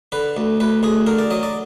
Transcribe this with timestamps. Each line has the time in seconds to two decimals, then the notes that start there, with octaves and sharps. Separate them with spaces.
0.12 D3 B4
0.37 D2
0.60 D2 B4
0.83 D2 G#4
1.07 D3 A#4
1.19 D5
1.30 F#3 D#5
1.43 D5